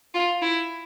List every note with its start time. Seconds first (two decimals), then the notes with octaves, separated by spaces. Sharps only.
0.14 F4
0.42 E4